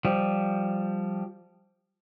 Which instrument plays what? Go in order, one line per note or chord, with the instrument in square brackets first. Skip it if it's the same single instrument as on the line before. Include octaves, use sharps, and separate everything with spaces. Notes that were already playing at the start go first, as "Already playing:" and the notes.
[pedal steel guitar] F3 G3